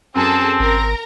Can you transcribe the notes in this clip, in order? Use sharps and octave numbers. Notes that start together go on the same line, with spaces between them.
F#2 C4 G#4 A4 A5
G#1 A#4 A#5